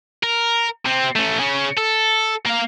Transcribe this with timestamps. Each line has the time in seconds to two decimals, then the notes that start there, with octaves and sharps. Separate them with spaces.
0.23 A#4
0.85 C3 C4
1.16 A3 C#4
1.40 C#3 C#4
1.77 A4
2.45 A#3 F5